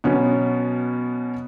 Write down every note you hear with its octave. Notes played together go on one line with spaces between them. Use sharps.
B2 F#3 B3 C#4